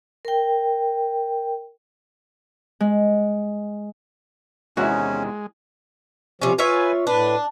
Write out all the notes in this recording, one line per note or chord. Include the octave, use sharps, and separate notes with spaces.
A#4 G5
G#3
E2 C3 D#3 G#3 C#4 E4 F#4
C3 F3 G3 C#4
F4 B4 C#5 E5 G#5
A2 D4 B4